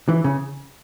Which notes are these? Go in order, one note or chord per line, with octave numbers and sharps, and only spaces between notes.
E3
C#3